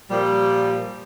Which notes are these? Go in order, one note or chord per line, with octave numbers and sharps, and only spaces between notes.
A#2 F3 G3